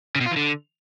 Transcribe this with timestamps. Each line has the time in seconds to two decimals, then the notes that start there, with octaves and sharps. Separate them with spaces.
0.16 C#3
0.21 B2
0.26 F4
0.31 E3
0.36 D3